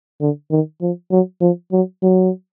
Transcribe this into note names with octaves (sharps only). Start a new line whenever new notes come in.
D3
D#3
F3
F#3
F3
F#3
F#3